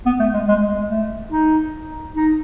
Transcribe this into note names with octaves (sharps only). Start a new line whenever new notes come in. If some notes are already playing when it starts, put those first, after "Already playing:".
B3
A3
G#3
G#3
G#3
A3
D#4
D#4